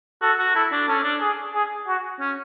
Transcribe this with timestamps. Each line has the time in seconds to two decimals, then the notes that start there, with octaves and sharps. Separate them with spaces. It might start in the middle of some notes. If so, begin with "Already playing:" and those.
0.22 F#4 A4
0.39 F#4
0.54 E4 A4
0.72 D4
0.88 C#4 A4
1.04 D4
1.21 G#4
1.54 G#4
1.88 F#4
2.20 C#4